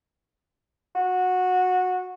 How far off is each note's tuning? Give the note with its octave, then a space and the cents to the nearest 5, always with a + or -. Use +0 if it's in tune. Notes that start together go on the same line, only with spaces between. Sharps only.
F#4 -15